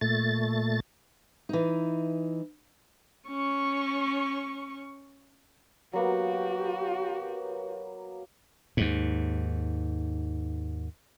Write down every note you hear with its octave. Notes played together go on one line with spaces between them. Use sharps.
A#2 A3 A6
E3 D#4
C#4 C#6
F#3 A#3 B3 F#4 G4
D#2 G#2